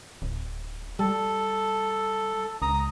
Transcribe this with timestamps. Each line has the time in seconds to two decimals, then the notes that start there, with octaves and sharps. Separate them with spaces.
0.22 D1
0.99 G3 A4
2.62 C#2 A#5 D#6